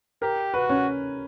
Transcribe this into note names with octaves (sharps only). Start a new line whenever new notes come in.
G4 A#4
F#4 B4
C#4